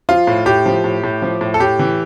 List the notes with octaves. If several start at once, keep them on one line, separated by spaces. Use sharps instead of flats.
F3 F4
A2
A2 G4
F3
A2
A2
F3
A2
A4
A2 G4
E3